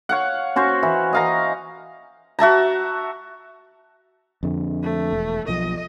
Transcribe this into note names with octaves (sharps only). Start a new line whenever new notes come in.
C#5 F5 F#5
C#4 F#4 C5 C#5
E3
D#5 F5 A#5
F#4 E5 A5 A#5
F2 D3
A3
E1
B1 F3 D#5